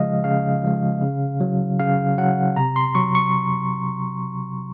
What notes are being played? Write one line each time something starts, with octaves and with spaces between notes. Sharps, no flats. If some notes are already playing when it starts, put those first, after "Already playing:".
Already playing: C#3 F3 G#3 D#5 F5
C#3 F5
F3 G#3
C#3
F#3
C#3 F5
F#3 F#5
C3 A#5
C6
F#3 C#6
C#6